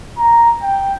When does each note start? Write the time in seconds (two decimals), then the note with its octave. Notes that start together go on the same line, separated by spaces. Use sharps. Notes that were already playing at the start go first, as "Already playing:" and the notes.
0.18 A#5
0.62 G5